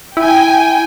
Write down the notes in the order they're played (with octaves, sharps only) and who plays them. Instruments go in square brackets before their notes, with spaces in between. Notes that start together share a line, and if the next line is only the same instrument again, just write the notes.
[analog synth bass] E4 [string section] G5 G#5